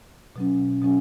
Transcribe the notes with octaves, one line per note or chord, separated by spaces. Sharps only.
B2 F#3 C#4
B2 F#3 C#4